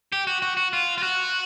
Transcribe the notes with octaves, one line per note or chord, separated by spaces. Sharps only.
G4
F#4
F#4
F#4
F4
F4
F#4